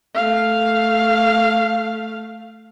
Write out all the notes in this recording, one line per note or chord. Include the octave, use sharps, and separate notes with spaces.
A3 F5